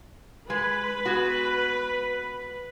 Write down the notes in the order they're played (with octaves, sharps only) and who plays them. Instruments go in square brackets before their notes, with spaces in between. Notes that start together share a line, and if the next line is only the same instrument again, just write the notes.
[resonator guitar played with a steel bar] G#3 [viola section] B4
[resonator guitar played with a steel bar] G#3 B3 F#4